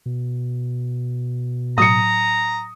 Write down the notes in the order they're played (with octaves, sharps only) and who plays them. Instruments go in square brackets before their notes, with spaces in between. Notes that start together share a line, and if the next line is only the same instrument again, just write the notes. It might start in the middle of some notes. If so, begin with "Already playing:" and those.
[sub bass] B2
[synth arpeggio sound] A2 F#3 [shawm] A#5 [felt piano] D#6 C#7